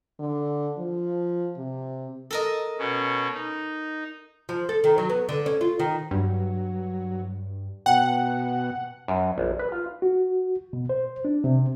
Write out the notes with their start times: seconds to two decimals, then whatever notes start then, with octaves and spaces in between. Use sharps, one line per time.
0.19 D3
0.78 F3
1.57 C3
2.31 A4 A#4 D#5
2.78 B2 C#4
3.34 D#4
4.49 F3
4.69 A4
4.84 D#3
4.98 F#3
5.10 B3
5.29 D3
5.46 C#4
5.61 F4
5.79 D#3
6.11 G2 F#3
7.86 B2 F#5 G5 A5
9.08 F#2
9.38 A#1
9.59 B4
9.72 F4
10.02 F#4
10.73 B2
10.89 C5
11.25 D4
11.44 C3